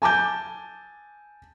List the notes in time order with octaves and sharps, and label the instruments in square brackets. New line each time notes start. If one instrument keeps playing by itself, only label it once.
[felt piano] G#5 A5 D6 G6